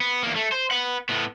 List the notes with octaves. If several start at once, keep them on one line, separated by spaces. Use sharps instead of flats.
B3
E2 A#3
A3
C5
B4 F#5
A2 B3